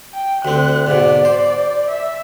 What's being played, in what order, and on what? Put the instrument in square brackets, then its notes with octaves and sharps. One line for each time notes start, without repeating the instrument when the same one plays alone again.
[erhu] G5
[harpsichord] D2 C4 [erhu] F#6
[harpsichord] G#2 B2 [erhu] D5
[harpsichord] C5
[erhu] E5